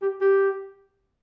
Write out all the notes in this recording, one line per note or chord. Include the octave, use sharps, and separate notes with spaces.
G4
G4